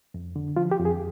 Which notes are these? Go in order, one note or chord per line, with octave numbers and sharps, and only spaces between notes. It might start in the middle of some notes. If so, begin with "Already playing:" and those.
F2
D3
F3 F4
G4
F2
G#4